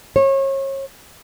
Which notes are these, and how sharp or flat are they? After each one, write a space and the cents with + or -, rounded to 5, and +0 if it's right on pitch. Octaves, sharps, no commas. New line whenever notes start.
C#5 -35